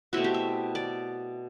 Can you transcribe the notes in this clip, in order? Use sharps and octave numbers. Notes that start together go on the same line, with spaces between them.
B2 A3 C4 E4 F#4
G4
E5
D5